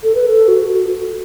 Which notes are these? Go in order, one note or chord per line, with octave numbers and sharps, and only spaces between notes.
A4
B4
A4
F#4